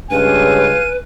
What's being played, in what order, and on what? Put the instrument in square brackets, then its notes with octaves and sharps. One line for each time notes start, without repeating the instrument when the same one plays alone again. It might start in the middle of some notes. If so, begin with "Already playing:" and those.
[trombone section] C#2 G2 C#3 [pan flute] B4 [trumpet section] F5 G#5 [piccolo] D#7